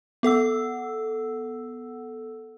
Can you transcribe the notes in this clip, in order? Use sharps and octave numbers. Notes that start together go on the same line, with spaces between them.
B3 A4 F#5 E6